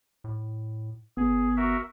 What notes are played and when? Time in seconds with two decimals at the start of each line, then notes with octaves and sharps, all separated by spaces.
0.24 A2
1.17 G1 B3 G#4
1.57 F#4 A#4 E5